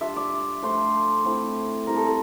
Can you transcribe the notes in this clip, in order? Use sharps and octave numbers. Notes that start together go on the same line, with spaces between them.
G3 D4 F4 E5
D5
F3 A3 D4 C5
A3 C4 E4
G3 C4 E4 A#4
A4
A4